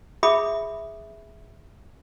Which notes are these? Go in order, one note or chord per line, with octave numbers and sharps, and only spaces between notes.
G#4 E5 B5 D#6